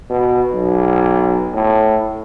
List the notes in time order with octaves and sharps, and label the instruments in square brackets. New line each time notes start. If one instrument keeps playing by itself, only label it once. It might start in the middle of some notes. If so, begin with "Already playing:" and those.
[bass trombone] B2
B1
A2